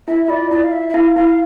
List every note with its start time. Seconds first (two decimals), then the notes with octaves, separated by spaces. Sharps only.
0.08 E4 E5
0.24 E5
0.28 F4 D5
0.50 E4 D5
0.64 F5
0.72 E5
0.89 E5
0.94 E4 F5
1.16 E4 F5